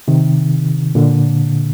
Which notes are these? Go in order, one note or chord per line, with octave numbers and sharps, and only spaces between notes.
C3 D#3
A#2 D3